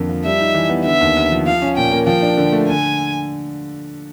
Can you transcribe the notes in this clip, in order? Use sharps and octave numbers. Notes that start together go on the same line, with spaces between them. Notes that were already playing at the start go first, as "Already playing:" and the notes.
Already playing: F2 D3 A#3
F3
G3 E5
D#4
E3
B3
D3 E5
D#2
D#2
F3
F3 F5
C#4
A#2 G5
A#3
F3 G5
D4
D3
A3
D3 G#5